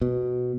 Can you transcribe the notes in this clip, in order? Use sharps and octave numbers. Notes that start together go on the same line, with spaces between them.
B2